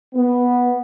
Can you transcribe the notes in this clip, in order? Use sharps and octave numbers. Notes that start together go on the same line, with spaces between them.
B3